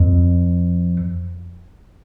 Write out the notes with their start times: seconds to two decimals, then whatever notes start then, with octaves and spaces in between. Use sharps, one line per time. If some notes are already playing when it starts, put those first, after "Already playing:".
Already playing: F2